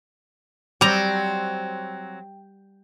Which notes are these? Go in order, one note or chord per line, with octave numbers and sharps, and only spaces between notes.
F#3 G3 C4 G5 A#5